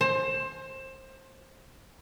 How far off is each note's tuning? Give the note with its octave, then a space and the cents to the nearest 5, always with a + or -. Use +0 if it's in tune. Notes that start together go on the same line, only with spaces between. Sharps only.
C5 +25